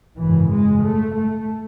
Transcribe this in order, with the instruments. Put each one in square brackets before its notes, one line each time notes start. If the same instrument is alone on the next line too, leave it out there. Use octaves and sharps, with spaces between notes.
[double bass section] G#1 F#2 C#3 E3
G#3
A3
A3